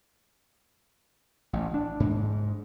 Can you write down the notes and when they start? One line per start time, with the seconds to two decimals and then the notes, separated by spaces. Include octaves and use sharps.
1.53 A1
1.74 D4
2.00 G#2